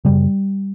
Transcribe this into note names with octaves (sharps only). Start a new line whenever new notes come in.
F#2 C#3 G3